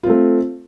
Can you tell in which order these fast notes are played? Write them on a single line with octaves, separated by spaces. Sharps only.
F4 C4 A3